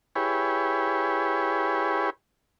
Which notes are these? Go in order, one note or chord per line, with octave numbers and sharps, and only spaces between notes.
E4 G4 G#4 B4 C#5